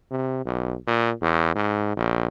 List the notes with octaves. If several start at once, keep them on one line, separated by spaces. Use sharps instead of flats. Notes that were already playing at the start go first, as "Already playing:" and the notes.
C3
B1
A#2
E2
G#2
A#1